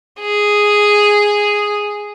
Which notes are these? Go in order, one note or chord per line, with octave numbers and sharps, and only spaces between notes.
G#4